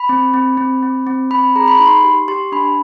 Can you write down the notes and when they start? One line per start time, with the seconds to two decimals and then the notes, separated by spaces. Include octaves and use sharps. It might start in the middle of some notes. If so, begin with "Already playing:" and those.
Already playing: B5
0.09 C4
0.34 C4
0.57 C4
0.82 C4
1.07 C4
1.31 C4 B5
1.56 G#4 A#5
1.68 B5
1.78 D#4 B5
1.86 C6
2.04 G4 C6
2.28 G4 C6
2.52 D4 B5